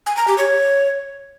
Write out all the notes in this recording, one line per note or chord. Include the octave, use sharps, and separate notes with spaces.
G#5
A#5
G4
C#5